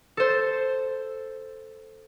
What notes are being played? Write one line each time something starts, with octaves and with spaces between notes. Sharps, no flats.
A4 C5